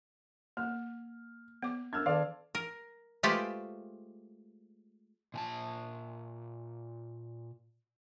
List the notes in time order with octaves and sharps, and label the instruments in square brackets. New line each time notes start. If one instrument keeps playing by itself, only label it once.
[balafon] A#3 [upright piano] F6
[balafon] B3 D6
[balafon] D4 A#4 [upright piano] E6 F6 G#6
[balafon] D#3 A4 A5 [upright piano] D5 F5
[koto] A#4
G#3 A3 F4 G4 B4 C5
[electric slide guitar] A#2 G#5 A5